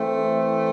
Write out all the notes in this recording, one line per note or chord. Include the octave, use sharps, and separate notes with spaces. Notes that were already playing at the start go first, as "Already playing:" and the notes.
Already playing: E3 A3 C4